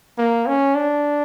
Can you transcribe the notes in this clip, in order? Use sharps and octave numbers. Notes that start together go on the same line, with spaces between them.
A#3
C#4
D4